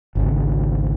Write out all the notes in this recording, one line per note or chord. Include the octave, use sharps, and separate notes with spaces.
G#1 C#2 D3